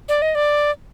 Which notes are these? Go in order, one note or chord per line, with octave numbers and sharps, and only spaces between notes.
D5
D#5
D5